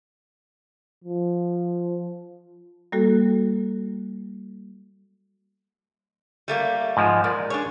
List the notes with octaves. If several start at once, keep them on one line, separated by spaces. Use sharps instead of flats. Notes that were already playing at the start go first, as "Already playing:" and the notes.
F3
G3 A#3 F#4 A4
G3 A3 A#3
G#2 F3 G#3
A#2 A#4 D5
D4 G#4 C#5